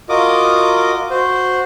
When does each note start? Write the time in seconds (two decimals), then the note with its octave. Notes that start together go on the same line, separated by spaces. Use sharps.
0.09 F4 F#4 A#4 D#5 D6 D#6
1.11 F#4 C5